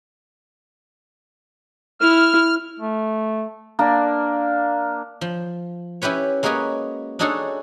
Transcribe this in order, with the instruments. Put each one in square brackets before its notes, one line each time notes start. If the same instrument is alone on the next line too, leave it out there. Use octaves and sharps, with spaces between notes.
[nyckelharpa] E4 [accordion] F6
[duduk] A3
[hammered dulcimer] A#3 D4
[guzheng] F3
C#4 E4 G4 B4 C#5
G#3 A#3 F#4 G#4 B4 C#5
D4 D#4 F#4 G#4 A4 C#5